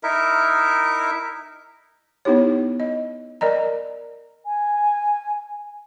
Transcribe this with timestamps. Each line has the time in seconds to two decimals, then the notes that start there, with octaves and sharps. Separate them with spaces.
0.03 D#4 E4 A#4 E5
2.25 B3 D#4 E4 G4 C#5
2.80 D#5
3.41 A#4 D5 D#5 A#5
4.44 G#5